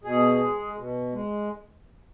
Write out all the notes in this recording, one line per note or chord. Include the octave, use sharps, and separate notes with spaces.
B2 G#4
G#3
B2
G#3